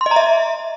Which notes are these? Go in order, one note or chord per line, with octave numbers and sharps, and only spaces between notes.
C6
D#5
A#5
E5